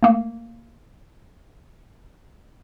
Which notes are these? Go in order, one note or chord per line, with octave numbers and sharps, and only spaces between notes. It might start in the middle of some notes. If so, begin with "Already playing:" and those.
A3 A#3